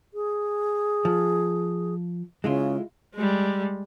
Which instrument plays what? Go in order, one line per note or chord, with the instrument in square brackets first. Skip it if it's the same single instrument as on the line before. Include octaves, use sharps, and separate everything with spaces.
[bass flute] G#4
[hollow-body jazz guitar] F3
[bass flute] C#3 [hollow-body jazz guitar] G#3 E4 F4
[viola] G3 G#3